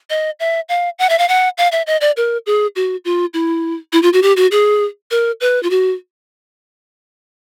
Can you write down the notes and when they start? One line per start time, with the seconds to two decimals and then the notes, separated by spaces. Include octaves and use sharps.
0.10 D#5
0.40 E5
0.69 F5
0.99 F#5
1.09 E5
1.19 F5
1.29 F#5
1.58 F5
1.72 E5
1.87 D#5
2.01 D5
2.17 A#4
2.46 G#4
2.76 F#4
3.05 F4
3.34 E4
3.93 E4
4.02 F4
4.13 F#4
4.23 G4
4.37 F#4
4.51 G#4
5.11 A#4
5.41 B4
5.63 F4
5.70 F#4